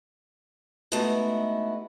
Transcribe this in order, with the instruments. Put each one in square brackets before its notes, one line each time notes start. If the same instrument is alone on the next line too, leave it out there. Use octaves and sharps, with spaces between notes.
[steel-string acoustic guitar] G#3 A3 B3 D#4 E4 F#4